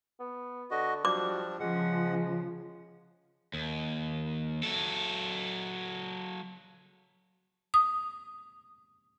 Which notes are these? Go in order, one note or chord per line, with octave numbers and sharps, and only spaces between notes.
B3
D3 F#4 D#5
F3 G3 D4 F#4 D6
C#3 F3 G#3 F#5
D#2
F#3 A4
D#6